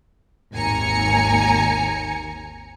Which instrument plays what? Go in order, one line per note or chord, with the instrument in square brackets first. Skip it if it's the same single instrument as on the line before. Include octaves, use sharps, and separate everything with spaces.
[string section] G#1 D#2 G#5 A#5 C#7